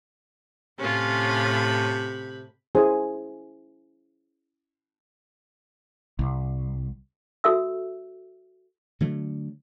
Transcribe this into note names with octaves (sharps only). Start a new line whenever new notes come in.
A2 C3 C#4 F4 B5
C#4 E4 G#4 C5 G#5
C2
F#4 A4 E5 E6
D3 F#3 A3